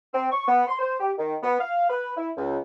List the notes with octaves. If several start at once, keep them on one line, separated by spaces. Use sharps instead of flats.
C4
C#6
B3
C6
C5
G4
D#3
B3
F5
B4
E4
C#2